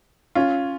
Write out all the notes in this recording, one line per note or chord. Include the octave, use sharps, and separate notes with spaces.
C#4 F4